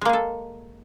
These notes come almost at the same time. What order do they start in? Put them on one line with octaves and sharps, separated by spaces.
G#3 A#3 G#4 A4